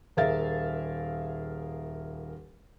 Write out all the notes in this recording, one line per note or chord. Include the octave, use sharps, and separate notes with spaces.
D#1 G#4 A#4 E5 F5 A6